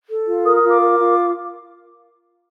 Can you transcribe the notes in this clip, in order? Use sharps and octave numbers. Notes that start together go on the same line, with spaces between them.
A4
F4
A#4 D#6
D#6
F4
D6
A#4
F4